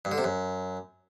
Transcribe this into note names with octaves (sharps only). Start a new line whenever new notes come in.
G2
D3
C3
F#2